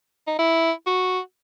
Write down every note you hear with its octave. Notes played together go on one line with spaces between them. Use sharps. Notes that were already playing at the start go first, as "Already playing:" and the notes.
D#4
E4
F#4